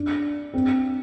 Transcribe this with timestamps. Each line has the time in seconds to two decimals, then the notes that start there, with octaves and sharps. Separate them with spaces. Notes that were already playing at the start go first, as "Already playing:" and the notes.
Already playing: D4
0.54 C4